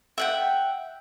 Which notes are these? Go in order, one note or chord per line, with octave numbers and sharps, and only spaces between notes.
E5 F#5 G5